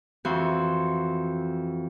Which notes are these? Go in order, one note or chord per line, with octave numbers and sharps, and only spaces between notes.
F2 E3 F#4 C6